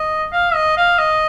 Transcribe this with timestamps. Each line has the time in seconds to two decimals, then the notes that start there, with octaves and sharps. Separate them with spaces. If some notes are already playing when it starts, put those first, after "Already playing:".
Already playing: D#5
0.32 F5
0.54 D#5
0.77 F5
0.98 D#5